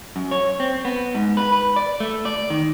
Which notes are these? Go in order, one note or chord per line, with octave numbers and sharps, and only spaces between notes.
F#2
C#5
C4
B3
G#2
B4
B4
D5
A3
D5
D#3